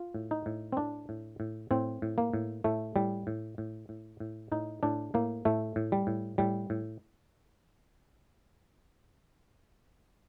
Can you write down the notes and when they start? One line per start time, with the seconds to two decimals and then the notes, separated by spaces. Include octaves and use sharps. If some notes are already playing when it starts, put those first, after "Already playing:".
Already playing: F4
0.14 A2
0.31 D#4
0.46 A2
0.72 C4
0.77 A2 D4
1.09 A2
1.40 A2
1.71 A2 C4
2.02 A2
2.18 A#3
2.33 A2
2.64 A2 A3
2.96 A2 G3
3.27 A2
3.58 A2
3.89 A2
4.20 A2
4.52 A2 D#4
4.83 A2 D4
5.14 A2 A#3
5.45 A2 A3
5.76 A2
5.92 G3
6.07 A2
6.38 A2 G3
6.70 A2